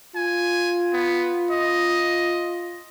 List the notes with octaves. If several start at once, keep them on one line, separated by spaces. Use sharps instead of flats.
F4 G#5
B3
D#5